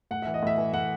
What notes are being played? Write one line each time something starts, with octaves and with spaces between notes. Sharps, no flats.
A2 F#5
E3 E5
D#5
A2 E5
E3
A2 F#5